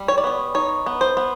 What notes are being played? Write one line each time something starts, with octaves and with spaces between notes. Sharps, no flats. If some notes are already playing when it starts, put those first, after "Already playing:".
Already playing: G3
C#5
D5
B3 C#5
D#4 C#5
B3
C5
B3